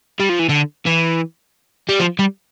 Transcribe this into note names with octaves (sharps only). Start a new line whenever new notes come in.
G3
F3
E3
D3
E3
G3
F3
G3